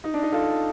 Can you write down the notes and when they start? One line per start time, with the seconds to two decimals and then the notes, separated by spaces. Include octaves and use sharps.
0.04 D#4
0.14 D4
0.23 D#4
0.32 F4 A4